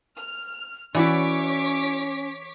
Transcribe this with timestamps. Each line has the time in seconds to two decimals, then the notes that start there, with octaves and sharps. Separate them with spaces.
0.17 F6
0.95 E3 C#4 E4 F#4 C#5 D5 D6 B6